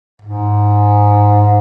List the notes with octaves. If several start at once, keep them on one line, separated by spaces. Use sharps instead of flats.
G#2